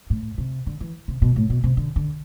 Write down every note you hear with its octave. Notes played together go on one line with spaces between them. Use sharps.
A2
C3
D3
E3
C3
B2
A2
B2
C3
D3
D3